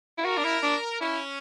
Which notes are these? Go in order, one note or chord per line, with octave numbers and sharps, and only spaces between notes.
E4
F#4 A#4
D4
E4
D4
C#4 E4